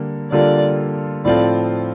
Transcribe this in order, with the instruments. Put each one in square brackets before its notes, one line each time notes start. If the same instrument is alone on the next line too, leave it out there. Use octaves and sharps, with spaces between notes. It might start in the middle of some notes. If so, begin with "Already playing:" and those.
Already playing: [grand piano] D3 G3 A#3
[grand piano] D3 G3 A#3 F4 A4 [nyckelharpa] D5
[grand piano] A2 F3 C4 F4 A4 [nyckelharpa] D5